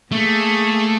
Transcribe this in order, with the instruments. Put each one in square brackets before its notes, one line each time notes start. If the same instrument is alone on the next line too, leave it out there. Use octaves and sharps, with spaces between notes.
[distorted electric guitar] A3 [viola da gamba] A#3 G#4